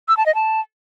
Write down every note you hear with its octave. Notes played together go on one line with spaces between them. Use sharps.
E6
A5
D#5
A5